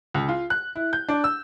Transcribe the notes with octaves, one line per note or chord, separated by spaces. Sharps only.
C#2
F4
F#6
E4
G6
D4
E6